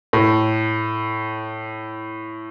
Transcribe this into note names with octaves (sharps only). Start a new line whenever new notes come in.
A2